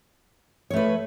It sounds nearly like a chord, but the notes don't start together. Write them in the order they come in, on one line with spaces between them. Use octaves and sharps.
C#5 A3 B4